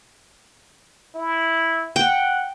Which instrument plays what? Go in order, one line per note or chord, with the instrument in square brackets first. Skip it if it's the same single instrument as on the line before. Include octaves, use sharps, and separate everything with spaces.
[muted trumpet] E4
[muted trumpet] F#5 [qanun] G5